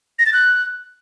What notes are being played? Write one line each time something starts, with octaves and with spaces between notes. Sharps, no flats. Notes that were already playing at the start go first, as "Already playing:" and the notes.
A#6
A6
F#6